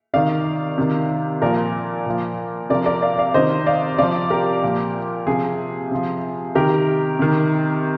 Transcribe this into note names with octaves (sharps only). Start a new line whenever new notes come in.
C3 D#3 D5 F5
C3 D#3
A#2 F3 A#4 D5
A#2 F3
C3 F3 A#4 D5
A#4 D5
D5 F5
D5 F5
C3 D#3 C5 D#5
D5 F5
C3 F3 D5 F5
G4 A#4
A#2 F3
C3 F3 G#4
C3 F3
C3 D#3 G4 A#4
C3 D#3